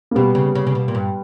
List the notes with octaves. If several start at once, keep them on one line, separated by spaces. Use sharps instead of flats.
A#3
B2 G3 B3
C#3
C#3
C#3
B2
A#2
G2